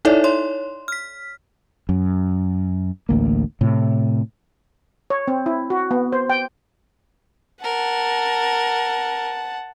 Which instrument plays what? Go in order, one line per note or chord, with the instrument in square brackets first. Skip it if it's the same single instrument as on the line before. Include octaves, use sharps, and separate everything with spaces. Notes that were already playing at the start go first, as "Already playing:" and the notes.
[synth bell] D#4 E4 A4 C#5 D5 E5
C#5 C6
F6 B6
[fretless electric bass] F#2
A1 D2 A#3
A2 C3
[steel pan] C#5
C4
E4
F#4
B3
C5
G5
[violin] A#4 [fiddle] F#5 A5